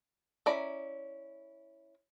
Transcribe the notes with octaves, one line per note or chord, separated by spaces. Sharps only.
C#4 E4 D5 A#5 B5